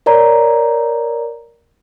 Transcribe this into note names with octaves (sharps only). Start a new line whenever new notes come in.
A#4 C#5 D5 A#5